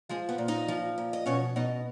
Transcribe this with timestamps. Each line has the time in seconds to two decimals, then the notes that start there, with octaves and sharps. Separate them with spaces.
0.09 F3 G#3 G#4
0.29 B3 B4
0.38 A#2
0.48 D#4 D#5
0.68 F3
0.98 A#2
1.13 D#5
1.26 B2 C#4 C#5
1.56 B2 D#4 D#5